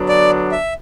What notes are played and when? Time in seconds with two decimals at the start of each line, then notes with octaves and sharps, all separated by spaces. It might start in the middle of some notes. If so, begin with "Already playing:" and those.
Already playing: D3 F#3 B3 D4
0.09 D5
0.52 E5